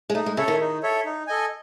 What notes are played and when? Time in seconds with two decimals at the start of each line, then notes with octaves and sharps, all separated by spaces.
0.10 G#3
0.15 A3 D#4
0.26 G#3
0.37 C#3 A4 C#5 E5
0.48 D#3
0.60 D#4
0.83 A4 C#5 E5
1.05 D#4
1.27 A4 D#5 G#5